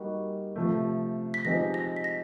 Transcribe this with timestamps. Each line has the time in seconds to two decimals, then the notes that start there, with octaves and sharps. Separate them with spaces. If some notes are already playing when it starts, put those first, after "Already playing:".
Already playing: G3 A#3 D#4 F#4
0.56 C3 F3 A3
1.34 B6
1.45 F3 G#3 C4 D#4 G4 A#6
1.74 A#6
1.96 B6
2.04 A#6